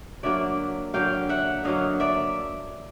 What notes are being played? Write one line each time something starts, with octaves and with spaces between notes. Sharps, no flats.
D3 F#3 A#3 D5 E5
D3 F#3 A#3 F5 G5
E5 F#5
D3 F#3 A#3 D#5 F5
D5 E5